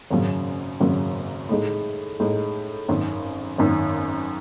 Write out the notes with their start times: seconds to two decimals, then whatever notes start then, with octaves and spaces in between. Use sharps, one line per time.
0.11 G#1 F#2 C#3 F#3
0.80 G#1 F#2 C#3 F#3
1.49 A2 G#3 D#4
2.20 A2 G#3 D#4
2.88 G#1 F#2 D#3
3.58 G#1 F#2 D#3